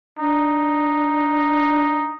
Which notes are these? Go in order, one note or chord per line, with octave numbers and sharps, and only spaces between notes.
D4 D#4